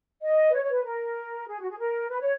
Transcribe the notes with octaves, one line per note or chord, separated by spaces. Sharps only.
D#5
B4
C#5
C#5
B4
A#4
G#4
F#4
G#4
A#4
B4
C#5